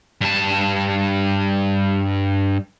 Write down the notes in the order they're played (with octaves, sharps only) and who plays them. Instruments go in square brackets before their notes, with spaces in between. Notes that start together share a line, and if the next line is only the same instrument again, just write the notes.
[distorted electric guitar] G2 A5